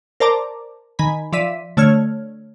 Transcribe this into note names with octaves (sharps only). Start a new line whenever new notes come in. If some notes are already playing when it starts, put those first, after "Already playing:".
A#4 C5 D5 A5 A#5 D6
D#3 G#5 B5
F3 D5 E5 B6 D#7
D3 A3 C#5 F6 G#6